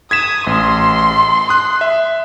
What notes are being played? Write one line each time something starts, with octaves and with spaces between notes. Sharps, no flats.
D#6 G#6 B6 E7
A1 C6
D#6 F#6
E5